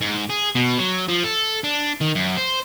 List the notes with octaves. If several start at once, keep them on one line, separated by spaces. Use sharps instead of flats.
G#2
G#4
B2
F#3
F3
A4
D4
D#3
F#2
C5